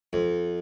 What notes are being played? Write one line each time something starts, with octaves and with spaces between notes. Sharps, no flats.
F2